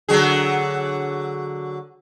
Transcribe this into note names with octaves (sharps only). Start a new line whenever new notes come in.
D3 F#3 G#4